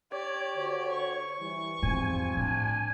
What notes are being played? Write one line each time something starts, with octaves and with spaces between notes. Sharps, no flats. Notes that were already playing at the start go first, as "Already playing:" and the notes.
G4 C#5 D5
D3 F#4 C5
C#6
E3 G3 E4
E2 G#2 F3 G3 C4 G#5
A2 D4